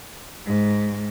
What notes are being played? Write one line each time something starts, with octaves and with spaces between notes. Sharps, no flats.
G#2